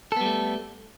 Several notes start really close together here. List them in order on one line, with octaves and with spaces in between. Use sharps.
A4 B3 G3 A3